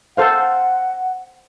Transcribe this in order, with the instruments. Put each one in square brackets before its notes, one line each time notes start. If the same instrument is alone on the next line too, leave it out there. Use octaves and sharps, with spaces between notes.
[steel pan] A4 C5 F5 [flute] F#5